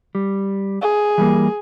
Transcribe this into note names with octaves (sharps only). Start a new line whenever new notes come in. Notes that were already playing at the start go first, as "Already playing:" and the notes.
G3
G#4
E3 G3 A#3